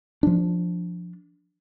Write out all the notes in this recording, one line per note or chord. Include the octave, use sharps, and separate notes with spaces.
F3 D4